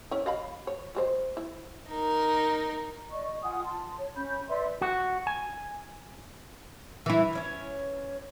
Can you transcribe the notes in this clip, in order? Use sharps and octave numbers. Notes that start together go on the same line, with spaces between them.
C#4 E4
D#5 F5 B5
C#5
F#3 G#3 C5
E4
D#4 A#4
D5 D#5 C#6
F4 F#5 G#5 D#6
A5 C6
C#5
C#4 B5 G6
B4 D5 E5 C6
F#4
G#5
E3 E4
E3 C#4 C#5